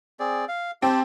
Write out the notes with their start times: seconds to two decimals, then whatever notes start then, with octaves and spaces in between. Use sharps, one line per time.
0.20 C4 G#4 D5
0.48 F5
0.82 C4 G4 A5